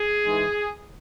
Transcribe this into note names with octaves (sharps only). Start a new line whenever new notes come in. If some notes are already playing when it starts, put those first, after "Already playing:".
Already playing: G#4
G#2 E3 G#3